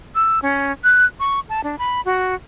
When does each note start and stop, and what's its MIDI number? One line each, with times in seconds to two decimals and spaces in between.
0.15 0.39 88
0.42 0.72 61
0.84 1.05 90
1.20 1.40 85
1.49 1.61 81
1.64 1.76 62
1.79 2.01 83
2.05 2.35 66